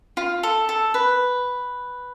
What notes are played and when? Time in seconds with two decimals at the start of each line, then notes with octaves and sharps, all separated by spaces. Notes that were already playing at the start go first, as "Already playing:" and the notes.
0.17 F4
0.43 A4
0.69 A4
0.94 B4